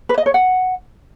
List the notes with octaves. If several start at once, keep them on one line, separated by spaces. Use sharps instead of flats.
B4
D#5
C#5
F#5